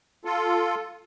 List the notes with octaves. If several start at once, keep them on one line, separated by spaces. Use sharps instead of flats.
F4 A4